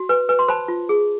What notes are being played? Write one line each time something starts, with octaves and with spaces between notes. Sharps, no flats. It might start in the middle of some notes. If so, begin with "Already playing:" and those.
Already playing: F#4
B4
B4
C6
C5 A5 B5
F4
G#4